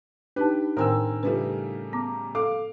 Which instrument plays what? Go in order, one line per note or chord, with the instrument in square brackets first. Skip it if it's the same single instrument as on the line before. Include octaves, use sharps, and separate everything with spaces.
[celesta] D4 D#4 A5 [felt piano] G4 [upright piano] B4
[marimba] A2 D#3 G5 [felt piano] C4 G#5 [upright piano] A#4 E6
[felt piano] C#3 G3 A3 [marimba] F4 B4
[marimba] B3 [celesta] A#5 D6
[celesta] A4 [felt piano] F5 [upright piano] D6